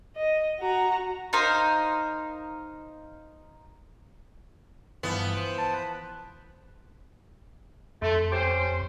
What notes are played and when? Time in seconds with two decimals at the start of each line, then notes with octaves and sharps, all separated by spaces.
0.16 D#5
0.60 F#4 A#5
1.33 D#4 A#4 C5 F5
5.03 G2 E3 F3 B3
5.35 C5 D7
5.58 A5
5.74 B4
8.02 F2 A3 C6
8.32 C#4 G4 C5